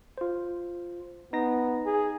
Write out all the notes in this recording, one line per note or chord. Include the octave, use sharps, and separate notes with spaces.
F4 C5
B3 D#4 A#6
G#4